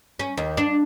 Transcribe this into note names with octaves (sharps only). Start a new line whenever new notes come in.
C#4
D#2
D4